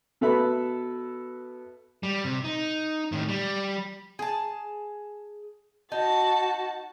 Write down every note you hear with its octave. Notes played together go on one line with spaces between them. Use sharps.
B2 A4 B4 E5 B5
G3
C3
D#4
A2 D#3
G3
G#4 A5
D#4 F#4 A5